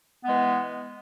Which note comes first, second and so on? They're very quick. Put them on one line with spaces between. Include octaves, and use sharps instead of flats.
B3 G#3 E3